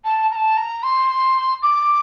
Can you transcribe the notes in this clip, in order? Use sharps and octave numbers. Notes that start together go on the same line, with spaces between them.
A5
A#5
A5
A#5
C6
D6